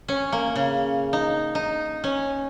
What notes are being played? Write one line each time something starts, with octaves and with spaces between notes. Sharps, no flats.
C#4
A#3
C#3
D#4
D#4
C#4